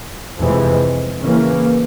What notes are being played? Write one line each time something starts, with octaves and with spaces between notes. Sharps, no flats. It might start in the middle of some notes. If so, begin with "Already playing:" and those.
F2 C3 E3 G#3
C#3 E3 A#3 C#4